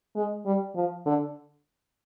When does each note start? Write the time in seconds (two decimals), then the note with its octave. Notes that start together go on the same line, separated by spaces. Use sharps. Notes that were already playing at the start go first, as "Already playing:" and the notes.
0.16 G#3
0.46 G3
0.75 F3
1.06 D3